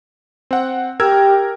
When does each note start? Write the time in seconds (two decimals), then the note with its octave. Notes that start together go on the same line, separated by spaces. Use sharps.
0.51 C4 F#5
1.00 G4 A#4 E6 G#6